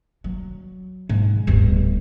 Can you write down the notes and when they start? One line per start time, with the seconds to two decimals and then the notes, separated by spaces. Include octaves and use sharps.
0.24 F#3
1.09 G#2
1.47 D1 G1